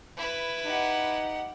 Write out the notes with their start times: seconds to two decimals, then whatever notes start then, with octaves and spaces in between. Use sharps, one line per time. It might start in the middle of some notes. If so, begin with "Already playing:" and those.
0.17 E4 B4
0.65 D#4 G4 F#5